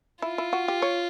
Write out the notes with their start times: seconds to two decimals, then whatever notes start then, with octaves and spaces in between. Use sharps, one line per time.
0.22 E4 F4
0.38 E4
0.53 F#4
0.68 G4
0.82 C#5